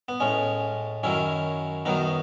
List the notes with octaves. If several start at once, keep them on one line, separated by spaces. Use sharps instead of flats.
B3
A2 G#3 C#4
F#2 D#3 F#3 C#4 E4
F#2 D#3 F#3 B3 D#4